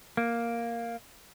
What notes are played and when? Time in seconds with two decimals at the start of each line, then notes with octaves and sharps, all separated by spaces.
0.17 A#3